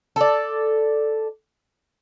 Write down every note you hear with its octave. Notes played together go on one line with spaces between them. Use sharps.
A4 D5